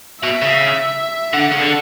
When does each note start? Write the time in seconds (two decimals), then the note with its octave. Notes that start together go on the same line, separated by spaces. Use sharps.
0.23 B2 E5
0.42 C#3
1.33 D3 F#5
1.51 C#3
1.60 D3